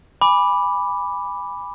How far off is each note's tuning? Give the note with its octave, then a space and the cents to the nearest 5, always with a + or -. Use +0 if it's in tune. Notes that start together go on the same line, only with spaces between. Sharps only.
G#5 -20 B5 +0 D6 +0